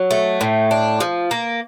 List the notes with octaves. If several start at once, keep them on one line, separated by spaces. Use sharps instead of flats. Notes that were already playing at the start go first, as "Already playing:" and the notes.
Already playing: F#3
A3
A2
D4
F3
A#3